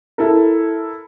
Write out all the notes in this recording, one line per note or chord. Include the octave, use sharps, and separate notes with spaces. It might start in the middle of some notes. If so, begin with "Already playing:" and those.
E4 A4 A#4